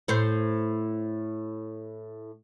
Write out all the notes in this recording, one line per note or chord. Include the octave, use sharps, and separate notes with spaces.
A2 C5